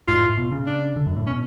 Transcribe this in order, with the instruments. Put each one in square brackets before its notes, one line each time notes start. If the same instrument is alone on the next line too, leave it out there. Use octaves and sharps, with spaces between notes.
[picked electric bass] G#2 [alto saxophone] F4
[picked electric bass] A2
B2
C#3
[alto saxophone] D4
[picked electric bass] D3
F#2
A2
[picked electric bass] B2 [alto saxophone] C#4